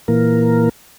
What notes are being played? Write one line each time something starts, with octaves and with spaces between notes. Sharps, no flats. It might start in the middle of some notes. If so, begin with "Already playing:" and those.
A#2 E3 A#3 A#4